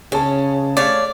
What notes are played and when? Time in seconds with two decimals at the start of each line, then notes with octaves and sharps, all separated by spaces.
0.12 C#3 C#4 G#4 A5
0.77 A3 C#5 D5 F5